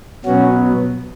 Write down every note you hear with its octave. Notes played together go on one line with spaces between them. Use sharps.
B2 F#3 B3 C#4 F#4